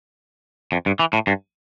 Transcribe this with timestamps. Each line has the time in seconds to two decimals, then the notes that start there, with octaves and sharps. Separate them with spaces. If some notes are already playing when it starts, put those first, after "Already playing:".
0.72 F2
0.86 G2
0.99 E3
1.13 A2
1.27 G2